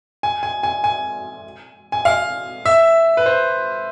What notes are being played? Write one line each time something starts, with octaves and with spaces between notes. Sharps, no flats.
G#5
G#5
G#5
G#5
G#5
F5
E5
B4
C5